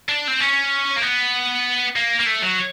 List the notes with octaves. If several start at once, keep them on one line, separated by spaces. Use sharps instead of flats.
D4
C4
C#4
A#3
B3
A#3
A#3
A3
F#3